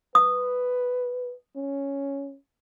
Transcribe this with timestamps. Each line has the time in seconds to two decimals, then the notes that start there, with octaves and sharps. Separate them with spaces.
0.15 B4 D#6
1.56 C#4